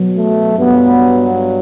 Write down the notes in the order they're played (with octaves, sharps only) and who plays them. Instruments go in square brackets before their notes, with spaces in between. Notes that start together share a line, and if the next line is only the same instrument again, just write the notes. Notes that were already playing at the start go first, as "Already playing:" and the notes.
Already playing: [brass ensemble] B2 F#3
A3
G2 F#3 B3